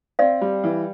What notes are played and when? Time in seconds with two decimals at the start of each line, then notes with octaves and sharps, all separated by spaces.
0.19 C4 D5 F5
0.41 G3
0.64 E3